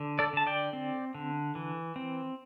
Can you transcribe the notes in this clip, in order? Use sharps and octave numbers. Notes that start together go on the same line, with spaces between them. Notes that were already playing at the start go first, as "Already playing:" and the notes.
Already playing: D3
A4 D5
D3 A5
D5 G5
C4
D3
E3
C4